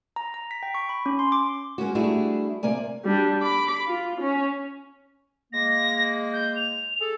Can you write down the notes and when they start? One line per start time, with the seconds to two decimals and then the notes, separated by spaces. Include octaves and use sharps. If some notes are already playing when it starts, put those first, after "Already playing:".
0.16 A#5
0.34 A#5
0.51 B6
0.63 G5
0.75 C#6
0.89 B5
1.06 C#4
1.19 C6
1.32 D6
1.78 G#3 A#3 C#4 F#4
1.95 G3 A3 D4 E4 F#4 G#4
2.63 C3 A#3 D5 G#5
3.05 G3 D4
3.42 B5 D6
3.87 F4
4.21 C#4
5.53 G#3 A#3 A#6
6.33 G6
6.56 F7
7.00 G#4 A4